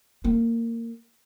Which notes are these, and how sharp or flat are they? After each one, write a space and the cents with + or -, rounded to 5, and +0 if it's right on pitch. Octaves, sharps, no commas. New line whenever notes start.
A#3 -20